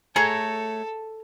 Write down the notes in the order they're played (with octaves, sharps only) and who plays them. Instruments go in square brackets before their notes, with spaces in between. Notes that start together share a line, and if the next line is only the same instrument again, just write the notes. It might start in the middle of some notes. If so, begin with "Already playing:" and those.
[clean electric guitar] A3 C#5 [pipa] G#4 A#5 [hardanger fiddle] A4